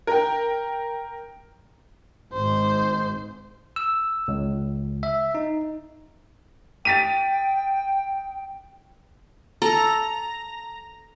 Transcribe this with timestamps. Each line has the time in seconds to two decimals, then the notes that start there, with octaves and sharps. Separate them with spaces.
0.07 A#4 G5
2.33 G#1 G#2 C5
3.76 E6
4.28 C#2
5.03 E5
5.35 D#4
6.85 G5 A6 B6 D#7
9.62 A4 A#5